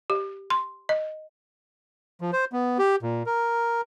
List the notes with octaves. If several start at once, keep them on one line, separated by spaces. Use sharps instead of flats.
G4
C6
D#5
F3
C5
B3
G4
A#2
A#4